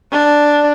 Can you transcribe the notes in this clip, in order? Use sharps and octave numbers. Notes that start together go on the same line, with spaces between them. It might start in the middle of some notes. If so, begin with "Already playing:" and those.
D4